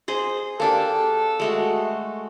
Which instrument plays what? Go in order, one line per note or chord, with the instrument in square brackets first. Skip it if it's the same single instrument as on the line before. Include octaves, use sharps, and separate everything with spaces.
[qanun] G#4 C5 D#5
[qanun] A#3 D4 G4 [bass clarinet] A4
[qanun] G#3 A3 F#4